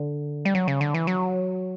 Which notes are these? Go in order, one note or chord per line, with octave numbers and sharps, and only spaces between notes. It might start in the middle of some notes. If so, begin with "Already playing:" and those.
Already playing: D3
G3
F#3
C#3
D3
E3
F#3